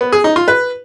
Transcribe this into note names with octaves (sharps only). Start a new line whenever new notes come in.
B3
G#4
D#4
F4
B4